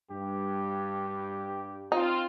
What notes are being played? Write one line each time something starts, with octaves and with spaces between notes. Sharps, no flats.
G2 G4
C4 D#4 F4